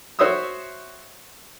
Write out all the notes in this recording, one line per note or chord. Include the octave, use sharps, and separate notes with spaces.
F#4 C5 C#5 E5 D#6 E6